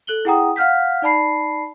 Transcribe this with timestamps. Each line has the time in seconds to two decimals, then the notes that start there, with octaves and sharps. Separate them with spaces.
0.07 A4 F#6 F#7 G7
0.25 E4 G#4 F#5 G5 A#5 D#6
0.56 F5 F#5 F6 G6 B6
1.02 D#4 D5 A5 B5 C7